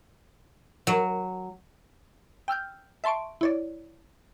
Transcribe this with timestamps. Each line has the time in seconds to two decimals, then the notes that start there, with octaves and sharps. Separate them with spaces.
0.87 F#3
2.48 G5 E6 F6 G6
3.04 E5 A5 C6 C#6 D7
3.41 E4 C#5 D5